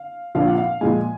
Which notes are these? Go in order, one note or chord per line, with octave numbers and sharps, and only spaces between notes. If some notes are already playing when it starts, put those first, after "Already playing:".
Already playing: F5
A#2 F3 A#3 D4 F5
F#5
F5
A#2 F3 G#3 G#5